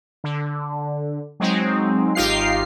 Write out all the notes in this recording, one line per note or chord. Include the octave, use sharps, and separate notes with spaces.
D3
F#3 G#3 C4 D#4
G#1 D#4 F4 G4 F5 C7